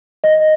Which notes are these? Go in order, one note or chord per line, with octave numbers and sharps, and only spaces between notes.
D#5